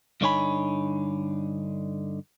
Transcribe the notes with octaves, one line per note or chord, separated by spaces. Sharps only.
G2 D3 D#4 C#5 G#5 B5